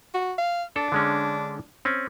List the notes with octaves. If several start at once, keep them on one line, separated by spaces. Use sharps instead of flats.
F#4
F5
D4 A4
D3 G#3 C#4
C4 C#4